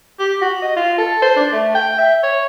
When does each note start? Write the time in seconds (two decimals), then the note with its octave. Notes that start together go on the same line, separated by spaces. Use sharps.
0.19 G4
0.41 F#4
0.62 D#5
0.76 F4
0.98 A4
1.22 C5
1.36 D4
1.52 A3
1.74 G5
1.98 E5
2.23 C#5